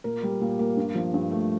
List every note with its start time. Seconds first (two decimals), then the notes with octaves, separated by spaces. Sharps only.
0.04 A#2 A#4
0.23 G3
0.41 A#2
0.59 A#3
0.77 G2
0.95 F3
1.14 G2
1.31 A3